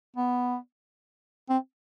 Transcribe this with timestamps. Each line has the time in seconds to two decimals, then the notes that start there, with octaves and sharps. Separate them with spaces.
0.16 B3
1.49 C4